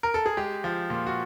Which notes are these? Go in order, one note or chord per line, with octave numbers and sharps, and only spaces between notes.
A#4
A4
G#4
G#3 G4
F3
A#2
F#4